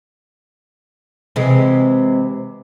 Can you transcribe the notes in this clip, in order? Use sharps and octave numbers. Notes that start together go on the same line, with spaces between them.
C3 E3 G#3